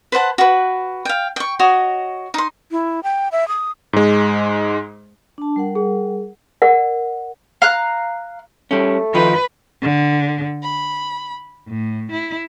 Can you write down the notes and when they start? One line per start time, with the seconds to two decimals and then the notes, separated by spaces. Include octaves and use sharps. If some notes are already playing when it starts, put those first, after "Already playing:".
0.12 B4 C5 F#5 A5
0.38 F#4 B4
1.05 F5 G5
1.36 G5 C#6
1.59 F#4 C#5 D#5
2.34 D#4 C6
2.71 E4
3.04 G5
3.32 E5
3.48 D#6
3.93 G#2 G#3
5.38 D4 A5
5.56 G3 A#4 F#5
5.75 G#4
6.62 A#4 D5 F#5
7.62 F5 A#5 F#6
8.71 G3 A3 C#4
9.14 D#3 F3 D#4 B4
9.80 D3
10.64 B5
11.67 A2
12.10 E4